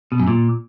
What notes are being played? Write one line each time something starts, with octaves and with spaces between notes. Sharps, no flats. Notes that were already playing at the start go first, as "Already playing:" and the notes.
B2
F#2
A#2